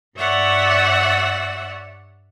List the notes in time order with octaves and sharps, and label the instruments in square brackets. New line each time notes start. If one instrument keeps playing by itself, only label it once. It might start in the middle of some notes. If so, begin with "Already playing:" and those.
[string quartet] G2 C#5 D5 E5 F#5 E6